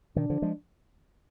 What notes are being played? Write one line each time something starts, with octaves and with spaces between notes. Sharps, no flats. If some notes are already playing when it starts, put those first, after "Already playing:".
B2 D#3 D4
D3 F3
F3 G#3